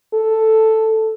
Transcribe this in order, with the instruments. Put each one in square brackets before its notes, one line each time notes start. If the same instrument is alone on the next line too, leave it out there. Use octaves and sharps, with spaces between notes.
[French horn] A4